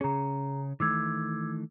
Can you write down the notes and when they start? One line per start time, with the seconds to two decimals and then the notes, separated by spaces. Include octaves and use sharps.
0.01 C#3 C#4 G#4 A#5
0.80 D#3 E3 A3 D6 E6 G#6